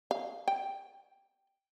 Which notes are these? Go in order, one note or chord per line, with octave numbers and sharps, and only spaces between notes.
F5
G5